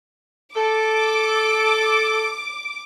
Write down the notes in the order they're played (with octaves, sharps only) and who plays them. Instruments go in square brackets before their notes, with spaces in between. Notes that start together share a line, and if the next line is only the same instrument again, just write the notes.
[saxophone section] A4 [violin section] D6